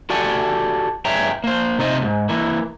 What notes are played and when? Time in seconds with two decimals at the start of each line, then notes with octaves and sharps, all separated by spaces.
0.10 F#4 G4 A4 D5 F#5 G#5
1.05 G2 G#4 C#5 E5 G5 A#5
1.44 A#3 C5
1.78 C3 D#4 C5 D#5
2.01 C#2 G#2
2.29 E3 A#3